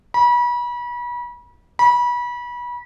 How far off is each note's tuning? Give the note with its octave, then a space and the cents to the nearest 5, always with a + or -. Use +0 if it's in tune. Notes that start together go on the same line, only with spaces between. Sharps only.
B5 -35
B5 -30